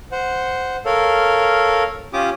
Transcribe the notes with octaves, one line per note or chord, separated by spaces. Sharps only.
C5 F#5
A4 A#4 C#5 F5
C#4 F4 G4 D6 D#6